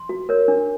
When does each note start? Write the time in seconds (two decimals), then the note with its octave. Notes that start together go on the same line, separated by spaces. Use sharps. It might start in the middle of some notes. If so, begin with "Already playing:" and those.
Already playing: C6
0.09 F#4
0.29 A#4 C#5
0.48 D4